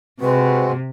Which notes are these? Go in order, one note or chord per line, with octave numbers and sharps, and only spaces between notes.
C3 G#3 C4 F#4 B4